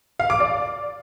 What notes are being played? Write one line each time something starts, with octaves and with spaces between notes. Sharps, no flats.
F5
D6
D5